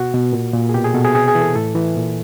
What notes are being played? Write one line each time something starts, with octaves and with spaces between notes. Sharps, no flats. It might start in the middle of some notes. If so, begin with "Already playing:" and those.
Already playing: B2 F#4
B2
A#2
A#2
G#4
B2 G4
G#4
B2 A4
G#4
C3 G#4
G#4
E3
A4
A2 A4
E3
A#2